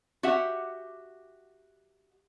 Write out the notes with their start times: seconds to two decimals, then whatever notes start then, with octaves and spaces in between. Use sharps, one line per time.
0.23 F#4 G4 E5 F#5